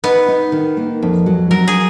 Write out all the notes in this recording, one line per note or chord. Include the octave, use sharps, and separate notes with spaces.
B3 D#4
D#4
D#3
A#3
F2
F#3
F#3 A#4
G#4